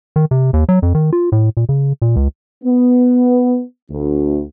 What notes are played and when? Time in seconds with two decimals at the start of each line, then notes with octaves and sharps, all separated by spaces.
0.16 D#3
0.31 C3
0.53 D#2
0.69 F#3
0.82 F2
0.95 D#3
1.13 F4
1.32 A2
1.57 A#2
1.69 C#3
2.02 A#2
2.16 C#2
2.64 B3
3.91 D2